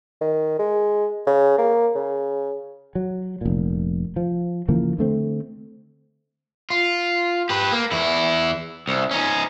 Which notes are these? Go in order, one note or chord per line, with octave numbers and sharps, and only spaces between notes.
D#3
G#3
C#3
A#3
C#3
F#3
F1 A#2
F3
C#3 E3 F3 A#3
D3 A3 C4
F4
G4 B4
A#3
E2 E4
C2
C#4 D#4